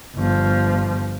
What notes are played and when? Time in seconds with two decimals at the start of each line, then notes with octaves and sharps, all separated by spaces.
0.16 G1 F3